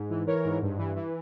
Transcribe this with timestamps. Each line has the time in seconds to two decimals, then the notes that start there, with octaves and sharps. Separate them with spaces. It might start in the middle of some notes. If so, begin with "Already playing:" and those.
Already playing: G#2
0.10 E3
0.27 E3 A#4 C#5
0.45 G#2
0.62 G2
0.78 E3
0.96 E3